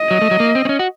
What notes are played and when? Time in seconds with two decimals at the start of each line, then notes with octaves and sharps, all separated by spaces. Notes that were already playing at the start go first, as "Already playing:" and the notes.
Already playing: D#5
0.11 F#3
0.22 A3
0.31 F#3
0.40 A#3
0.55 C4
0.65 C4
0.69 C#4
0.79 F#4